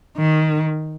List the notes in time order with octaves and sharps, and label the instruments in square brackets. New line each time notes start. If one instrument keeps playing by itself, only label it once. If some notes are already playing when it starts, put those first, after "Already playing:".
[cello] D#3